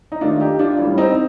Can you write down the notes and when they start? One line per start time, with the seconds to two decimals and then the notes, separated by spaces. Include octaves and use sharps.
0.12 D#4
0.21 D#2 D#3 A3 D4 F4
0.41 D#4 G4
0.59 D4 F4
0.79 A1 A2 G3
0.98 C4 D#4